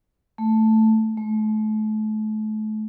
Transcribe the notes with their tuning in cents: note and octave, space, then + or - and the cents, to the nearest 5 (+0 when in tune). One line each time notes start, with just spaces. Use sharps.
A3 +0
A3 -35